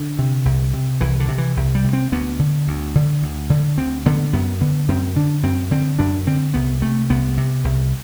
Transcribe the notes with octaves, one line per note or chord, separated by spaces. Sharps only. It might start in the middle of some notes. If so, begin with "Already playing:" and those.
Already playing: D3
C3
C2
C3
C2 E3
D3
C3
E3
C2
G3
C3
C4
D2 B3
D3
D2
D3
D2
D3
D2 C4
D3 B3
F#2 B3
D3 B3
F#2 C4
D3 D4
F#2 C4
D3 C4
F#2 D4
D3 C4
C2 B3
C3 A3
C2 B3
C3
C2